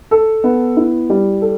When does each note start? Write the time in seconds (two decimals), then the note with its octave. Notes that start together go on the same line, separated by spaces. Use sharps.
0.11 A4
0.44 B3
0.77 E4
1.10 G3
1.42 A4